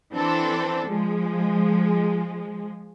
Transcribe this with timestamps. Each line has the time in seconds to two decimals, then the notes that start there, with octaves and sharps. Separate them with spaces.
0.13 E3 C4 D4 A4
0.86 F3 G#3